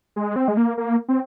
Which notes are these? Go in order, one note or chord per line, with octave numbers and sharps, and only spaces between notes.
G#3
C4
G#3
A#3
A#3
C4